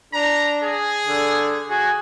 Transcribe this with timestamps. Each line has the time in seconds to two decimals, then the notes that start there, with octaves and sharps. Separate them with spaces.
0.13 D4 A#5
0.63 G#4
1.07 D3
1.69 F#4 G#4